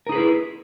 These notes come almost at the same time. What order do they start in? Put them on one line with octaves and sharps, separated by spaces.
A#4 D#4 G#4 B4 E4